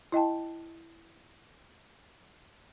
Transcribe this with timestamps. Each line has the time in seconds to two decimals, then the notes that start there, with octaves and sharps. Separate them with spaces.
0.12 E4 D#5 G5 A5